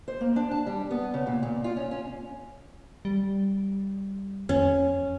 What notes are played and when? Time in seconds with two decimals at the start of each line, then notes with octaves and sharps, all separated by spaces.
0.08 C5
0.21 A#3
0.36 D4
0.51 A5
0.66 G3
0.91 B3
1.14 C#3
1.27 A#2
1.43 A#2
1.64 F4
1.77 C#4
1.91 C#4
3.05 G3
4.49 F2 C#4